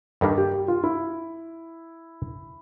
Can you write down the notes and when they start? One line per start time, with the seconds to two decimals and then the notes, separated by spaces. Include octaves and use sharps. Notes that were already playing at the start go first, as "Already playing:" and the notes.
0.21 G2 D#3 G3 A#3 D4 A4
0.38 G4
0.52 G4
0.68 F4
0.84 E4